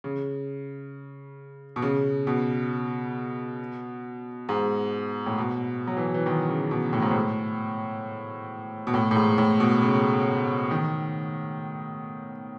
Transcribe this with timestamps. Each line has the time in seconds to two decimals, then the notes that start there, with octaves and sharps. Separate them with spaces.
0.04 C#3
1.76 B2
1.82 C#3
2.27 B2
4.49 G#2
5.26 A2
5.38 B2
5.87 F#3
5.97 E3
6.14 E3
6.26 D#3
6.48 C#3
6.71 B2
6.93 A2
7.02 G#2
7.11 A2
8.87 B2
8.94 A2
9.11 A2
9.16 G#2
9.38 A2
9.60 B2
9.81 C#3
10.71 D#3